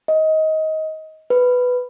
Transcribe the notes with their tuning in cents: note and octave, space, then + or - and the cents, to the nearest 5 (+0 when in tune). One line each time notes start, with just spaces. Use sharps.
D#5 +20
B4 +5